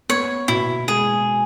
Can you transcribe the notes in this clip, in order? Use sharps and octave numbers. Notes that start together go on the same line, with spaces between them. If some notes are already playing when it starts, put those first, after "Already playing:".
B3 C#5
B2 E4
G#3 G#4